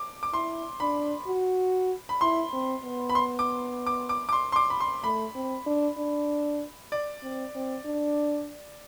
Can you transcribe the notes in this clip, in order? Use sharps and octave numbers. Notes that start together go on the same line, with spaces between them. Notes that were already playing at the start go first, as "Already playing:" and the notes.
Already playing: D6
D6
E4 C6
D4 B5
F#4
B5
E4 C6
C4
B3
B5
C6
D6
D6
D6
D6
C6
C6
D6
B5
C6
A3 B5
C4
D4
D4
D5
C4
C4
D4